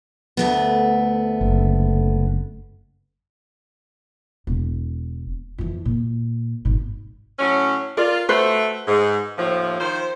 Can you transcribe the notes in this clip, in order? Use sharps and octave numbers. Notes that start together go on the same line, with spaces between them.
D2 A3 B3
F#1
E1
F2 E3
A#2
G#1 B2
A2 F#3 C#4
F4 A#4 D5
A3 F#4 B4 C5
G#2
D#2 A2 F3
D#3 F3 C5